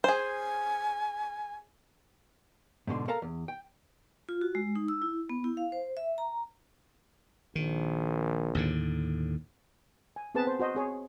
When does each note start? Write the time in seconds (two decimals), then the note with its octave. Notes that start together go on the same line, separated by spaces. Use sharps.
0.04 G#4 C5 G#5
2.87 G#2 B2 D3 C6
3.08 A4 A#4 F5 A5 A#5
3.22 E2
3.48 G5
4.29 F4
4.41 F#4
4.55 G#3
4.75 D#4
4.88 E6
5.02 E4
5.29 B3
5.44 E4
5.57 F5
5.72 C5
5.97 E5
6.18 A#5
7.55 A#1 D#3
8.55 D#2 A2 D3
10.16 G#5
10.35 B3 C4 G#4 B4 A5
10.47 C5
10.60 F#4 C5 D#5
10.75 C4 G#4 C#5